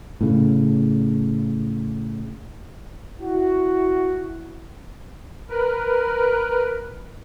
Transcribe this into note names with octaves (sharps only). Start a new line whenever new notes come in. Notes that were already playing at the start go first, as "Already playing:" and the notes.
A2 C#3
E4 F#4
A#4 B4